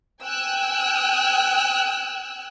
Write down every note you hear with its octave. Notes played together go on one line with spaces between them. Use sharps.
G5 G#5 E6 F#6